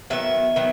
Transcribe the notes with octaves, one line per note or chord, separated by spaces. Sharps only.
D#3 F#3 B3 E5
D#3 F#3 B3